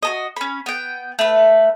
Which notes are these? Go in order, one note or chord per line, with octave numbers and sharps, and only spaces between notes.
F#4 A4 D#5
C#4 B5
B3 G5
A3 B4